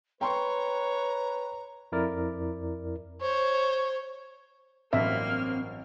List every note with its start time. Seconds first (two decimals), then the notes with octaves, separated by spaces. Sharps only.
0.21 B4 C#5 G5 A#5 C6 C#6
1.92 F2 E4 A#4 D5
3.21 C5 C#5
4.93 A1 G2 F#3 A#3 C4 E5 F6